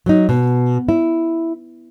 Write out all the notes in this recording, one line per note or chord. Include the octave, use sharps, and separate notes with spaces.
F#3 D#4
B2
E4